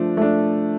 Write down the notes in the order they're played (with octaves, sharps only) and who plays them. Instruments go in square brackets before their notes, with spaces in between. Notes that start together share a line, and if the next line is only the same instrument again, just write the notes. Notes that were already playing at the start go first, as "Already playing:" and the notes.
Already playing: [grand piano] F3 A3 D4
A3 D4